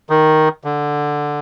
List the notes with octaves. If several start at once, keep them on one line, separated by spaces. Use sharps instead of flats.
D#3
D3